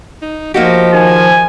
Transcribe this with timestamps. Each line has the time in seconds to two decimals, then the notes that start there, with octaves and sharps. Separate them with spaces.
0.22 D#4
0.54 F3 A#3 D#4 F#4 G4
0.93 D#3 G#5